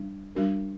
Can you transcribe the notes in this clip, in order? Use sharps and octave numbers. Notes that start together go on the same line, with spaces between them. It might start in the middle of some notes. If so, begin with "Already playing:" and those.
Already playing: G3 D4
G3 D4 F#4 A#4